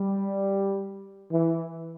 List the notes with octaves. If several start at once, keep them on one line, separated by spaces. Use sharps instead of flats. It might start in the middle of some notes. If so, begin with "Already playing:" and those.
Already playing: G3
E3